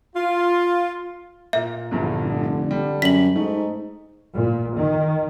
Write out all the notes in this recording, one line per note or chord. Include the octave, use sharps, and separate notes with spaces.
F4
A#2 A#3 E5
A#1 E2 G2 A#2 D3
F1
G3
F#2 B6 F#7
G#2 A3 D#4
A#2
D#3